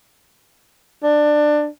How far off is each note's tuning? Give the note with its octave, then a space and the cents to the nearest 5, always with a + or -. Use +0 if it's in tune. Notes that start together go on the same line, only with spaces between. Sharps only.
D4 +20